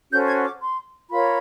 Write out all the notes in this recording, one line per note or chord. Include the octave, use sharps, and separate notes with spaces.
C#4 F#4 A4 C5 G6
G#6
D6
C6
F4 A#4 C#5 B5